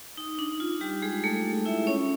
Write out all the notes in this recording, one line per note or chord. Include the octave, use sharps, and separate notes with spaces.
D#4
D4
F4
G3 G4
G#3 G#4
A3 A4
E4 E5
C#4 C#5